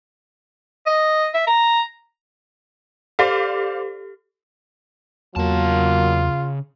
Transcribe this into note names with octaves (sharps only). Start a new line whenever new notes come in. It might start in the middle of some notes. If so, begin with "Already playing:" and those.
D#5
E5
A#5
G4 A4 C5 D5 F5
E2 C#3 F#3 A#3 F4 A5